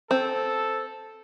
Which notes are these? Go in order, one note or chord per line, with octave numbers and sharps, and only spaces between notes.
C4 A4